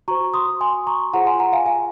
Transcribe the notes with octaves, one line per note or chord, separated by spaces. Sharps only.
F#4 C5 A#5 C#6
C6 D#6
G#5 C6
A#5 C#6
F4 G#4 C5 F#5 A#5
G#5 C6
F#5 A#5
F5 G#5
F5 G#5